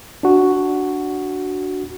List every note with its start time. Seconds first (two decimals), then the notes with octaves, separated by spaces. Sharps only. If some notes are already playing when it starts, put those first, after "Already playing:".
0.23 D4 F#4